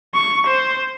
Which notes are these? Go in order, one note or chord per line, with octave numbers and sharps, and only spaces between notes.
C#6
C5